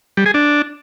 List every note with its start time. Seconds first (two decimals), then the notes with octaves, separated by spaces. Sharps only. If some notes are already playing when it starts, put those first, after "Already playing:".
0.17 G3
0.26 G#4
0.34 D4